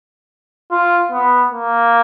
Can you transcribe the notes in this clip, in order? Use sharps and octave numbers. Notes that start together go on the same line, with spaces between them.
F4
B3
A#3